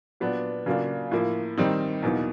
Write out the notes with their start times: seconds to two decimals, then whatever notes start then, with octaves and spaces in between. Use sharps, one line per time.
0.20 A#2 F#3 B3 D4
0.66 C#3 F#3 A#3 D4 F4
1.11 A2 F3 A#3
1.58 D#3 G3 C4 D#4
2.03 E2 B2 F#3 A#3 D#4